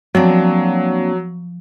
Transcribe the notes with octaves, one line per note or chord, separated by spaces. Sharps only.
F3 F#3 A#3 C4 D4